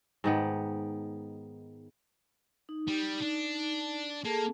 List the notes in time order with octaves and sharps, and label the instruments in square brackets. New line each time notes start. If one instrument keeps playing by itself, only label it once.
[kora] G#2 D#3 B3
[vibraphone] D#4
[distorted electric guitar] G3
D4
[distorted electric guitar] A#3 [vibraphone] G#4 A4 A5